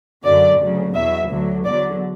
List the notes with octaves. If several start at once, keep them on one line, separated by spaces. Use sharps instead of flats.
F#2 D3 F#3 D5
D2 C#3 F#3
E2 B2 F#3 E5
D2 D3 F#3
E2 D3 F#3 D5